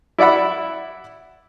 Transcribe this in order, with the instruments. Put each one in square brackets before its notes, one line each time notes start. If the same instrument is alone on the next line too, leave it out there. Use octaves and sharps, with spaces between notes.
[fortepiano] E4 D5 E5 F#5 B5